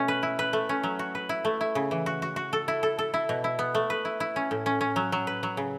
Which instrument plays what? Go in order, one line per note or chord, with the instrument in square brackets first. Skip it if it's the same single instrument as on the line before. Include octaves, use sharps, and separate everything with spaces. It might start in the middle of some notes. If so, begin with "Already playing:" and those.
Already playing: [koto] B2 A3 C#4
B4
E4
B4
A3
C#4
F#3
F#4
B4
E4
A3
E4
C#3
E3
F#4
F#4
F#4
A4
E4
A4
A4
E4
B2
E4
B3
A3
B4
E4
E4
C#4
A2
C#4
C#4
F#3
F#3
B4
F#3
C#3